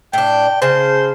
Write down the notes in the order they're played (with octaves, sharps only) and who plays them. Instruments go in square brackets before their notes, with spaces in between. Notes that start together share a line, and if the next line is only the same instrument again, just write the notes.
[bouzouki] A2 D4 [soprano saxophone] G5
[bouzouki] C#3 A5 [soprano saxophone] C5